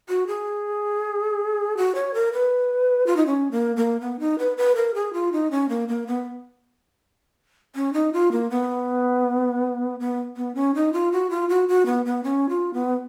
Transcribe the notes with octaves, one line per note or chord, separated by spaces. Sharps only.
F#4
G#4
F#4
C#5
A#4
B4
F4
D#4
C#4
A#3
A#3
B3
D#4
B4
B4
A#4
G#4
F4
D#4
C#4
A#3
A#3
B3
C#4
D#4
F4
A#3
B3
B3
B3
C#4
D#4
F4
F#4
F4
F#4
F#4
B3
B3
C#4
F4
B3